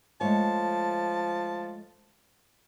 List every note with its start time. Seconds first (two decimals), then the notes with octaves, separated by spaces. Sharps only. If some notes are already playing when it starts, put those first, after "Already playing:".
0.21 F3 G#3 A3 C#5 A5